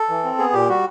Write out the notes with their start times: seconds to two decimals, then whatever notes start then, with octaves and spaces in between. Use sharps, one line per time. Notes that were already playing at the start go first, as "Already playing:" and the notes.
Already playing: A4
0.09 E3
0.24 C4
0.38 B3 G#4
0.53 A#2 G4
0.69 G3 F#4